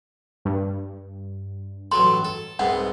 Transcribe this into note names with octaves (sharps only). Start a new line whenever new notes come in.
G2
A1 F#3 A4 C6
A4
C2 G#2 B3 F#5